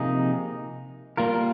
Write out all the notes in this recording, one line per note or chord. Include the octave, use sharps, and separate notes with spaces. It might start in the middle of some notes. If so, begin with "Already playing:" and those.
Already playing: C3 F3 A#3 D#4 G#4
G3 A#3 F4 A#4